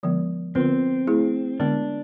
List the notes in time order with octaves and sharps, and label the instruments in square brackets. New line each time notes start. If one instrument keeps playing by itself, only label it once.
[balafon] D3 F3 G#3 B3
[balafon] D3 F3 B3 F4 B4 [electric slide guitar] C4
[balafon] A3 E4 G#4
[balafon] D3 G#3 B3 [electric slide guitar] D4